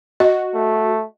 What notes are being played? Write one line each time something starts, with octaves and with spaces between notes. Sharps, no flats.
F#4 D#5
A3